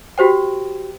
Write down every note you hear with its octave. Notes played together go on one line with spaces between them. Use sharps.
F#4 G4 C5 G5